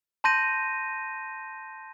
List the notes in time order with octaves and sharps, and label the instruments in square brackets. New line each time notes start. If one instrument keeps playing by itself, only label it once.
[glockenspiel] A5 C6 G6 A#6 D#7